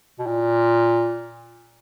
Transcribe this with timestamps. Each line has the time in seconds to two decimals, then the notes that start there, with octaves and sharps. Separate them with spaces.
0.19 B2
0.27 A#2